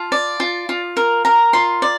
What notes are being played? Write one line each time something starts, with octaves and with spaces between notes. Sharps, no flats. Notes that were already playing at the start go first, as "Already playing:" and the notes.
Already playing: F4 A5
D5
F4
F4
A#4
A#4 A#5
F4 C6
D5